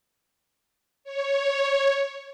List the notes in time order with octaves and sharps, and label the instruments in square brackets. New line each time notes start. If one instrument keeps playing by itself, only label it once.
[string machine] C#5